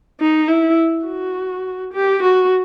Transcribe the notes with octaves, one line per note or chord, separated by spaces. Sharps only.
D#4
E4
F#4
G4
F#4